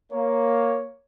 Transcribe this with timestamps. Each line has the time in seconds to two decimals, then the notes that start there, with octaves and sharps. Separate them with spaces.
0.12 A#3 C#5